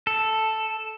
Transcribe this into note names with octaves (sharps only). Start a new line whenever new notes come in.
A4